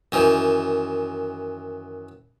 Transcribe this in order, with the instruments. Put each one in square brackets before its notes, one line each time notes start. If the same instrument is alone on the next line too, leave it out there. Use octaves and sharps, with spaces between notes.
[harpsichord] F#2 D#3 E3